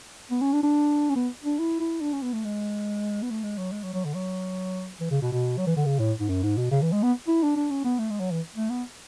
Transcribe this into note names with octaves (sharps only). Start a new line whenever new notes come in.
B3
C#4
D4
D4
C#4
B3
D4
E4
E4
D4
C#4
B3
A3
G#3
B3
A3
G#3
F#3
G#3
F#3
F#3
D3
F#3
E3
C#3
B2
B2
F#3
E3
D3
C#3
A2
G#2
F#2
G#2
B2
C#3
E3
G#3
B3
E4
D4
D4
C#4
B3
A3
G#3
F#3
E3
A3
B3